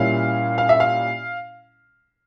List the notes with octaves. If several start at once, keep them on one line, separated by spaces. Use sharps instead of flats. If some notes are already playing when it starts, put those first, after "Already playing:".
Already playing: A#2 G3 C#4 E4 F5
F5
E5
F5